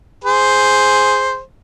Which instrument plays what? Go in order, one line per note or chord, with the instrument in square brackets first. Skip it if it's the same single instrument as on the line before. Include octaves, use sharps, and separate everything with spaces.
[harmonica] G#4 C5